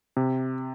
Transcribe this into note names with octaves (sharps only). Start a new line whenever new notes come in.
C3